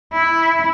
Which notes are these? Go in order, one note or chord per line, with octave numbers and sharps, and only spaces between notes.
E4